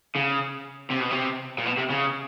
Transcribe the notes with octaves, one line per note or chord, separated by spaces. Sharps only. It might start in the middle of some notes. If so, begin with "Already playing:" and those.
C#3
C3
B2
C3
A#2
B2
C3
C#3